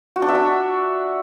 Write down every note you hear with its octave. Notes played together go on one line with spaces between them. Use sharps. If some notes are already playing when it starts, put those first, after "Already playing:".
F#4
D4
E5
D4